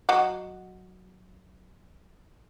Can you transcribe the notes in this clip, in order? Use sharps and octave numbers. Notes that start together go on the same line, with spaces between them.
F#3 D#5 F#5